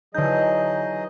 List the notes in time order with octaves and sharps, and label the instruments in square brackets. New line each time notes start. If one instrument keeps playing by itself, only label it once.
[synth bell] D3 G6 [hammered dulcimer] E3 D#4 [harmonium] F#3 G#4 D#5